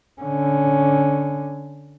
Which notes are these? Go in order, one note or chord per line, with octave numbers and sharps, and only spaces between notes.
D3 C#4